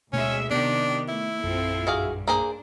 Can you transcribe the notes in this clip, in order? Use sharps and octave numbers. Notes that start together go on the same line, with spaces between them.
D2 B2 G#3 A3 C#4 E5
C3 D#3 B3 D4 G4
A3 E4
A#1 F#2 C4 F4 A4
G2 F#4 G#4 F5
A#3 D4 G#4 C5